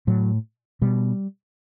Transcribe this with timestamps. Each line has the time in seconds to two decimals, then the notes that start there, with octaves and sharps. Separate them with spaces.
0.07 A2 F#3
0.82 B2 G3